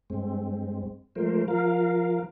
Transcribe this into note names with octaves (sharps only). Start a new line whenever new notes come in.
G2 G#3 C4
F3 G#3 A3 A#4 C5
F3 A#4 F5